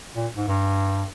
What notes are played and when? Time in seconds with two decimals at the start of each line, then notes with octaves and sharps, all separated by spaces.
0.16 A#2
0.37 G#2
0.48 G2